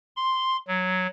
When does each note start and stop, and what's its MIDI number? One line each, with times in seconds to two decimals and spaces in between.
0.16 0.57 84
0.68 1.07 54